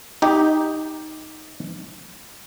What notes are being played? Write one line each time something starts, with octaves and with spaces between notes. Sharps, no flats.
D#4 G4